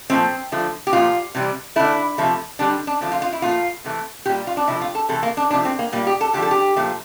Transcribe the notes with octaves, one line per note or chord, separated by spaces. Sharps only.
A#2 F3 A3 C4
D3 F3 A3
G4
A#2 F3 A3 F4
C3 E3 G3
D3 A3 E4
C3 F3 A3
D3 G3 D4
D4
D3 F3 A3
F4
F4
E4
A#2 F3 A3 F4
C3 E3 A3
A#2 G3 G4
F4
D4
C3 F3 A3 E4
F4
A4
C3 E3 A3 A4
A#3
D4
C3 F3 A3 D4
C4
A#3
A#2 G3 A#3
G4
A4
D3 F3 A3 G4
A4
G4
A#2 F3 A3